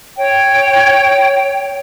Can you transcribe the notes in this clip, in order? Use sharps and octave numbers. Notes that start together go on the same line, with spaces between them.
C#5 G5